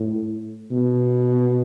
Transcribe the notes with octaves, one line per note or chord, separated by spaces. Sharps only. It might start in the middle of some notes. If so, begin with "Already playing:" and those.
Already playing: A2
B2